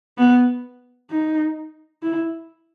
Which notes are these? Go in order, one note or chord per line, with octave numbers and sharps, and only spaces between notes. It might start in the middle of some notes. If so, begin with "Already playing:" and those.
B3
D#4
E4